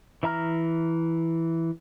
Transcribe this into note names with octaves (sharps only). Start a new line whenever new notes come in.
E3 E5 A#5 F6